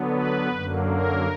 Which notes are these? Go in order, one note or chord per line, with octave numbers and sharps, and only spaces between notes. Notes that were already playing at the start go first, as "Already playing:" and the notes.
Already playing: D3 F#3 B3
B4
F#2 D3 F#3 A#3
A#4